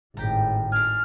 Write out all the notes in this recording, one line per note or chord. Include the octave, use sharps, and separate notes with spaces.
G#1 A2 G4 G5 A#5
D4 G#5 F6